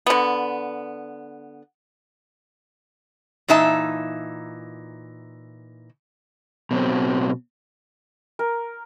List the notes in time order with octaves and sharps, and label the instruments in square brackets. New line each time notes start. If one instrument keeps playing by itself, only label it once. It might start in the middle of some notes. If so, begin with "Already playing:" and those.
[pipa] D3 B3
[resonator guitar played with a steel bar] A#2 E3 D#4 E5 A5
[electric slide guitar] B2 F#3 C4
[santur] A#4